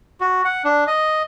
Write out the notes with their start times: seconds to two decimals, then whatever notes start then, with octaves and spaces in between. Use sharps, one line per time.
0.21 F#4
0.45 F#5
0.64 D4
0.87 D#5